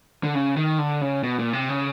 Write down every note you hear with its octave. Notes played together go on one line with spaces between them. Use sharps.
D3
C#3
D#3
D3
C#3
B2
A#2
C3
C#3